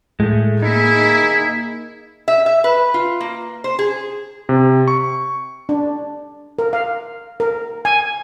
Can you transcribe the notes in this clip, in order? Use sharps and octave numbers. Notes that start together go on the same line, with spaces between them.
A2 G#3 A3
A#3 D#4 E4 G#4
E5
E5
B4
F4
A#3
C5
G#4
C3
C#6
D4
A#4
F5
A#4
G#5